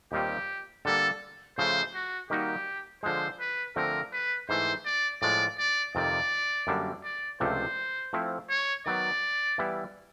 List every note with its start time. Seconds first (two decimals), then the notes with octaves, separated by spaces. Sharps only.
0.12 D#2 D#3 G3 C4 F4 G4
0.85 D3 G3 A#3 A4
1.57 C#3 F3 A3 C5
1.94 F#4
2.30 D#3 G3 A#3 D#4 F#4 G4
3.03 D3 F3 G#3 C5
3.40 B4
3.76 D3 F3 A3 C4 A#4
4.13 B4
4.49 G#2 E3 A3 C5
4.85 D5
5.21 A2 F3 G#3 D5
5.58 D5
5.95 F2 C3 D#3 D5
6.67 F#2 D3 G3 A#3 D4
7.04 D5
7.40 C#2 C3 F3 A3 D4 C5
8.13 F3 A3 C4 E4
8.49 C#5
8.86 D#3 F#3 B3 D5
9.58 E3 G3 B3 E4